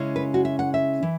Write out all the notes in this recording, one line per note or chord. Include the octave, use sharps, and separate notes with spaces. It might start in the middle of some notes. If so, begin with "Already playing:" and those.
Already playing: C#3 G#3 C#4 E4
B4
F#4
E5
F#5
E5
E3